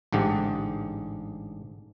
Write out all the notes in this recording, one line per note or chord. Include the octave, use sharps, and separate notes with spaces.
A1 G#2 D3 G4